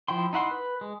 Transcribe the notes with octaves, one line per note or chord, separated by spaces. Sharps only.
F3 E4 G5 C6
D#4 E4 F#5 C6
B4
G#3